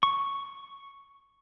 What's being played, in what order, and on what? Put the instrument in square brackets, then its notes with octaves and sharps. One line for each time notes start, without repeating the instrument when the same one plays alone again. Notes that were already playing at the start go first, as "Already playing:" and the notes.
[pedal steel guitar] C#6